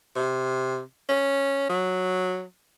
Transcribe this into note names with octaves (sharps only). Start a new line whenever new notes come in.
C3
C#4
F#3